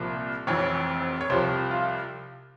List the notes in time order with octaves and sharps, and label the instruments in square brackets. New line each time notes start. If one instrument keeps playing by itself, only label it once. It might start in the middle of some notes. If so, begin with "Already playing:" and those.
Already playing: [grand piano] C2 A#2 F3
F1 F2 E3 C#5
C#5
C2 C3 F3 C5
F4